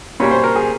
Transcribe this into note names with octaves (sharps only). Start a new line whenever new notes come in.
A#2 G3 C#5
C5
A#4
G#4